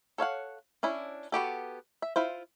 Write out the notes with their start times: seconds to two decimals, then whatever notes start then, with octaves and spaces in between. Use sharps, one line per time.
0.18 A4 C#5 F5 F#5
0.83 C#4 D4 E4
1.32 B3 F#4 G4 A4
2.02 E5
2.16 E4 F4 C5